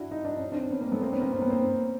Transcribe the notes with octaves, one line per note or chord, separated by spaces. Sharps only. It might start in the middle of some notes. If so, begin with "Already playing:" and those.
Already playing: D4 E4 F#4
D#4
D4
C#4
C4 D4
B3 C#4
A#3 C4
A3 B3
A#3 C4
B3 C#4
A#3 C4
C4
B3
A#3 C4